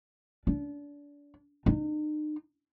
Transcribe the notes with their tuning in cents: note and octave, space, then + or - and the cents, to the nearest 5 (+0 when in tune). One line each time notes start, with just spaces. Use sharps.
D4 -30
D#4 -40